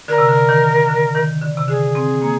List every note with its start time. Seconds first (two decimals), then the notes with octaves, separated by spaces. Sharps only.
0.08 D3 A#4
0.18 C3
0.29 D3
0.49 D#3
0.88 D3
1.15 D#3
1.42 D3
1.57 C3
1.68 D3 G#4
1.95 C4
2.22 A#3